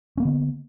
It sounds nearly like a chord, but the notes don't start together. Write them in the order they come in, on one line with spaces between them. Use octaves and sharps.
C#4 A#3 B3 D3